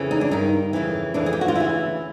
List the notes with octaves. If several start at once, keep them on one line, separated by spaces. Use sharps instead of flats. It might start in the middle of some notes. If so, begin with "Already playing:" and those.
Already playing: F2 C#3 E3
D#4
D4
G2 D#3 D#4
F2 C#3 E3
F2 C#3 E3 D4
G#4
G4
F#4
F4
D2 C#3 E3 E4